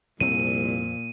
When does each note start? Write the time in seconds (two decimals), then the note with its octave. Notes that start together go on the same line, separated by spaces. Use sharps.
0.20 C2 F2 A#2 C4 D#7